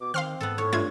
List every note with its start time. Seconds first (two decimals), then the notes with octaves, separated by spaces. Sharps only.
0.01 B2 D6
0.14 D#3 C4 F5 C6 F6
0.41 G#2 B3 A4
0.58 A2 C#5
0.73 G2 A3 F4 G#6